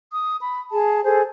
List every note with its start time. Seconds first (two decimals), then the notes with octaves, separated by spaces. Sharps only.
0.12 D#6
0.41 B5
0.71 G#4 A5
1.05 G#4 A4 C5